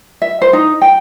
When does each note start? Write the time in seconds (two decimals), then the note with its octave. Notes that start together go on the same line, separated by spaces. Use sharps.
0.22 E5
0.42 C5
0.53 D#4
0.82 G5